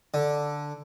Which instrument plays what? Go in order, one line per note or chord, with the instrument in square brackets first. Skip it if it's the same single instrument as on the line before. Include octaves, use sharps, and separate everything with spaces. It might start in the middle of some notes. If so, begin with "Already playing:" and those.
[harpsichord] D3